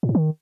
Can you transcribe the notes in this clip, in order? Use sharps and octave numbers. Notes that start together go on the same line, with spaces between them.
A2
G#2
D#3